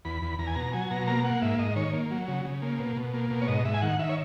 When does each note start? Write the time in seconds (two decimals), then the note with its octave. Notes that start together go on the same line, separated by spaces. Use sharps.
0.05 E2 B5
0.22 E2
0.39 E2 A#5
0.47 G#5
0.55 B2 A#5
0.73 F#3 G#5
0.91 B2 A#5
1.07 A#3 A#5
1.25 A#3 F#5
1.42 G#2 E5
1.59 G#2 D#5
1.76 D#3 C#5
1.93 A#3
2.11 F#3
2.28 C#3
2.45 C#3
2.62 A#3
2.79 B2
2.96 B2
3.14 A#3
3.31 B2
3.41 C#5
3.48 G#2 D#5
3.65 G#2 E5
3.74 G#5
3.82 D#3 F#5
3.99 D#3 E5
4.09 C#5